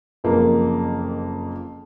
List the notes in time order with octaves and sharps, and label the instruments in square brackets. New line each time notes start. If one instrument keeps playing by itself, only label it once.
[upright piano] F#1 F2 F3 A#3